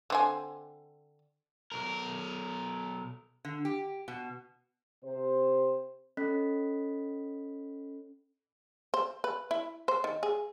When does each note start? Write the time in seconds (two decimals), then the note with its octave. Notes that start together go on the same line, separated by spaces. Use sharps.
0.10 D3 C4 G#5
1.72 B1 A#4
3.45 D3
3.65 G4
4.08 B2
5.04 C3 C5
6.17 C#4 A4 D#5 B5 F#6 B6
8.94 C5
9.24 B4
9.51 E4
9.88 C5
10.04 D#3
10.23 G#4